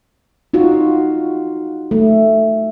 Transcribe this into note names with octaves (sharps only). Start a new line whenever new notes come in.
D#4 F4 F#4
A3